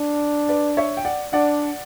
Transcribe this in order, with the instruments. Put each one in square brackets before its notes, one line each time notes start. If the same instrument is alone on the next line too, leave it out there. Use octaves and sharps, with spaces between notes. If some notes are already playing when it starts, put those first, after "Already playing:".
Already playing: [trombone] D4
[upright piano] B4 D5
C#5 E5
G5
D5 F#5
[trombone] D4 [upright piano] D5 F#5